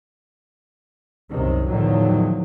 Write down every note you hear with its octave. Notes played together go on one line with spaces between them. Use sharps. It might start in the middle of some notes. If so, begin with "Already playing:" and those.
C2 F#2 C3 D#3
E2 A2 D3 D#3 F3 F#3